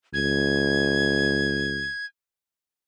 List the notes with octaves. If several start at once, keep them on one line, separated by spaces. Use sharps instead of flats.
C#2 G#6